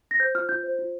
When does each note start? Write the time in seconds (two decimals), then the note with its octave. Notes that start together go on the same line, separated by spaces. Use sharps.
0.11 A#6
0.20 C5 G6
0.35 F4 F6
0.49 F4 G6
0.63 C5
0.79 F4